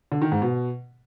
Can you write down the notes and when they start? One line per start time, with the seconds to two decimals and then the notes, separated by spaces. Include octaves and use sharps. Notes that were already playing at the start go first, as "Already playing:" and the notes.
0.12 D3
0.22 D#3
0.32 G#2
0.42 B2